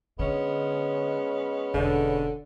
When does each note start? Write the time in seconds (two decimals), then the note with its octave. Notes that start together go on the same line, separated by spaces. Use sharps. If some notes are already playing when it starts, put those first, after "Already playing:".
0.19 D3 G#3 B3 C#4
1.74 E1 D3